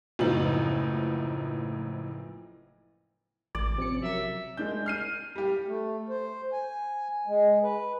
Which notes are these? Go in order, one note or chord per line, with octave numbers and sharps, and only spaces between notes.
F#1 A2 F3 B3 D#4 F#7
A1 D5
C3 F3 C#4 C#7
F#3 A#4 E5
G#3 D4 G6
F6 C7 D#7
G3 G4
A3
C5
G#5
G#3
B4